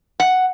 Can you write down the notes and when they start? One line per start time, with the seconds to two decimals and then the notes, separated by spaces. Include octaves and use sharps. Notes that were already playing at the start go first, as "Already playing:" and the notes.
0.20 F#5